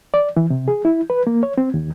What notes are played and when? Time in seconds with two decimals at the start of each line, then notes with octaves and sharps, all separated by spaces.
0.14 D5
0.36 E3
0.50 C3
0.68 G#4
0.85 E4
1.10 B4
1.27 A#3
1.43 C#5
1.58 C4
1.74 D#2